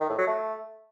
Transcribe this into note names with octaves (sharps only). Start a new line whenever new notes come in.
D#3
A2
F#3
A3